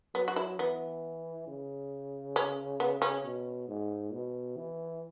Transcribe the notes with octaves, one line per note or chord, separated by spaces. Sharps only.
F#3 B3
F#4
E4
E3 B3
C#3
C#4
B3
C#4
B2
G#2
B2
E3